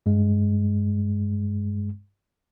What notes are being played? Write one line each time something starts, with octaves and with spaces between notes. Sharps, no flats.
G2 G#3